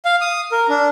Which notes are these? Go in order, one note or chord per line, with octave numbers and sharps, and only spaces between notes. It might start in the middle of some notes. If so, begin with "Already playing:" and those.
F5
D#6
A#4
D4